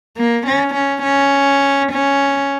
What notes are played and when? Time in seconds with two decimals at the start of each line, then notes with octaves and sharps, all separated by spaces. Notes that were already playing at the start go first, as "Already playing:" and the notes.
0.16 A#3
0.45 C#4
0.74 C#4
1.03 C#4
1.91 C#4